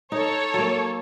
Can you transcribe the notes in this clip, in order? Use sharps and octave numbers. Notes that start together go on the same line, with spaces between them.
D#4 A4 C#5
F#3 A#3